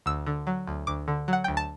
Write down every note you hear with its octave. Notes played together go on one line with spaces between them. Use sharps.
D2 E6
D3
F#3
D2
D2 D6
D3
F#3 F#5
D2 G5
A5